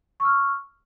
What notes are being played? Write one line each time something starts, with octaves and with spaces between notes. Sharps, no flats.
C#6 E6 F6